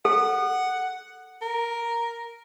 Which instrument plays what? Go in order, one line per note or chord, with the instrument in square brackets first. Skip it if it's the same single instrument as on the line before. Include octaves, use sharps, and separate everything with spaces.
[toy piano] A4 [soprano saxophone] F#5
[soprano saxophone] A#4